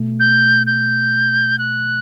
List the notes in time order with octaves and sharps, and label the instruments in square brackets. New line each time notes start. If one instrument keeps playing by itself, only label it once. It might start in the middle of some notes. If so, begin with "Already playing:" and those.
Already playing: [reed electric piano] B2 A3
[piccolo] G6
G6
F#6